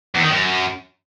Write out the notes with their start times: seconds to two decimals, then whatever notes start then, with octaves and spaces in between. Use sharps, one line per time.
0.15 E2
0.23 D#3
0.31 F#2